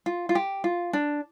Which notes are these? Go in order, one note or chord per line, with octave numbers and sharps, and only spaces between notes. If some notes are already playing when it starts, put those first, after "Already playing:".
F4
F4
G4
F4
D4